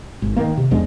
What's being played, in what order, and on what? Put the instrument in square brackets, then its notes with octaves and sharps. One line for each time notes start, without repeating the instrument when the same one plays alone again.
[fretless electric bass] G#1
D#3 A#3
C3
E2 F3 G#3 D4